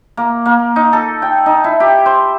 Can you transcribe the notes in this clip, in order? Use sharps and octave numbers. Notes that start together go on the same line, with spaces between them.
A#3
A#3
D#4
A4
G5
D#4
E4
G4
C5